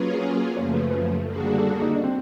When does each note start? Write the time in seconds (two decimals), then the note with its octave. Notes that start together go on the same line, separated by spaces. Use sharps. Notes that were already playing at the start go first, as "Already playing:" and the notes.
Already playing: F#3 A#3 C#4 F4 G#4 B4
0.57 F#2 C#3 F3 A3 C#5
0.74 B4
0.90 B4
1.24 D3 G3 A#3 D4 F#4 A4
1.36 G#4
1.47 G#4
1.58 A4
1.70 G#4
1.82 D#4
1.93 D4
2.04 C4